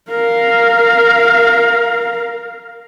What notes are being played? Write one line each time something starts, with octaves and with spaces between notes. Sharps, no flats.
A#4 F5